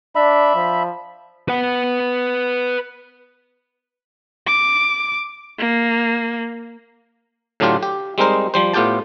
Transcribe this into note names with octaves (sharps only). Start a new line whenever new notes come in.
D4 E5 B5
F3
B4 F#5
D6
A#3
A2 D3 F#3 D4 F4 G4
G4
G3 G#3 C4 D#4 A#4 C5
F3 G3 C5
A2 B3 F4 G4 G5 A5